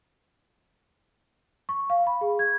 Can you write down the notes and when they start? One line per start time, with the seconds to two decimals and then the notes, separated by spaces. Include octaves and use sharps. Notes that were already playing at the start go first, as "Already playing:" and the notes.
1.69 C#6
1.90 F5
2.07 B5
2.21 G#4
2.39 G#6